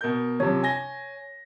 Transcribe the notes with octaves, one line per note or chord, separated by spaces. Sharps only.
B2 A#4 G6
F#2 C3 F3 C#5
G#5 A#6 G7